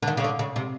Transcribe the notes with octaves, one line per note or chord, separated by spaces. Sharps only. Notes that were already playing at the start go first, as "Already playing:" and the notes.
D3
D#3
C#3
D3
C#3
C3